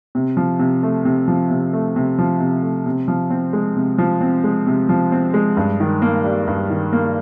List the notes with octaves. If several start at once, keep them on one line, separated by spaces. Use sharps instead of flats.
C3
F3
C3
A3
C3
F3
C3
A3
C3
F3
C3
A3
C3
F3
C4
G#3
C3
F3
C4
G#3
C3
F3
C4
G#3
G2
D#3
A#3
G3
G2
D#3
A#3